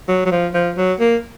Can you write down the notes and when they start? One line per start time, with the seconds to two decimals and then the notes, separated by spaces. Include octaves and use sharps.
0.09 F#3
0.26 F#3
0.31 F3
0.54 F3
0.77 F#3
1.00 A#3